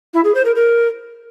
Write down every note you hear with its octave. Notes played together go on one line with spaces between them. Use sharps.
E4
G#4
C5
A#4
A#4